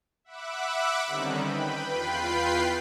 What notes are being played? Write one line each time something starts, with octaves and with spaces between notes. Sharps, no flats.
E5 F#5 B5 D6 E6 F#6
D3 D#3 G3 C4 C#4 D#4
B4 G5 B5
E2 F4 B4 G5 B5 C7